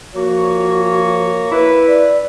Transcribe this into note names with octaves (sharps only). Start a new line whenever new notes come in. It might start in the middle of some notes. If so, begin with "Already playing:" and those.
F3 A#3 F#4 C#5
E4 B4
D5